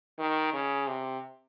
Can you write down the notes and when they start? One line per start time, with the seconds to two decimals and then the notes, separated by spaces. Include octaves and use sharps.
0.19 D#3
0.53 C#3
0.87 C3